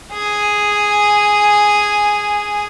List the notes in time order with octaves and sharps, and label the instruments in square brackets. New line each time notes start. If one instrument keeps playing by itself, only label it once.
[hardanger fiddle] G#4 G#5